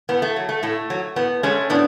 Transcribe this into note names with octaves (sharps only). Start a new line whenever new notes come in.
A2 B3
A3
F#3
A3
A2 A3
F#3
A2 B3
G#3 A3 C#4
A2 B3 D4